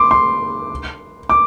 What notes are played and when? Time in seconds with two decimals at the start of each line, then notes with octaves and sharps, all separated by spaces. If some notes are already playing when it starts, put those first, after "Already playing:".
Already playing: C6 D6
0.11 C6
1.30 D6